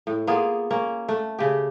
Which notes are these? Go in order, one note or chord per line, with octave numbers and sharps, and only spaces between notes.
A2
A#3 B3 F4 G#4
A#3 C#4
A3
C#3 G4